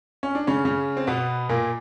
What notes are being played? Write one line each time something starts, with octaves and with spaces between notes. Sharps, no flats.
C#4
D4
C#3 C#4
C#3 C#4
C4
B2 B3
A#2 A#3